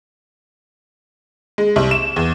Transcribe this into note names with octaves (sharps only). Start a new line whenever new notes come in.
G#3
C2
E7
E2